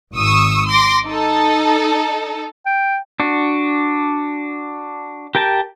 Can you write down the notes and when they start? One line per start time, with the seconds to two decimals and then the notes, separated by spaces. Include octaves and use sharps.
0.15 G#1 C#6 D#6 E6
0.68 C6 D6 A#6
1.04 D#4 A4
2.66 G5
3.20 D4 F#4
5.35 G4 A#4 G5 A5